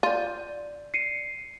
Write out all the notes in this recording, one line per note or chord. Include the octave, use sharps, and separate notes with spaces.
F4 D5 A6 D#7
C7 C#7 D#7